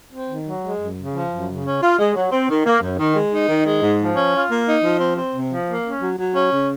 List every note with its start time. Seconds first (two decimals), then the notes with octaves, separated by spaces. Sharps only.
0.13 C4
0.30 D#3
0.48 F#3
0.63 G#3
0.80 F#2
0.97 C#3
1.14 F3
1.31 F#2
1.48 C#3
1.65 C#4
1.81 F4
1.98 G#3
2.14 F#3
2.31 C4
2.49 D#3
2.65 A#3
2.81 F#2
2.99 D#3
3.16 G#3
3.32 D#4
3.49 D#3
3.66 G#3
3.82 G#2
3.99 F3
4.16 C#4
4.34 F4
4.50 A#3
4.66 D#4
4.83 F3
5.00 C4
5.16 C4
5.34 C3
5.51 F3
5.67 A#3
5.83 C#4
6.00 F#3
6.17 F#3
6.34 C#4
6.51 C#3